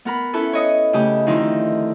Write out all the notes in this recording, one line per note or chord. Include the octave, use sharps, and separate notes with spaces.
B3 A#4 B5
C#4 E4 A4 B4
C#5 D#5 D#6
C#3 A3 G4 D#6
D3 D#3 F3 C4 D#4 E4